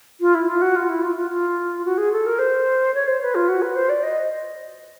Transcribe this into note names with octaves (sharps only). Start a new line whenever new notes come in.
F4
E4
F4
F#4
F4
E4
F4
F4
F4
F#4
G#4
A4
A#4
C5
C#5
C5
B4
F4
F#4
B4
C5
D5
D#5